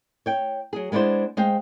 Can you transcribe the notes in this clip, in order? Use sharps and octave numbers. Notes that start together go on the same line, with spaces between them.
C#5 G5
F#3 G#4
G#3 B3 D4 E4 C5
G#3 C5 F5 G5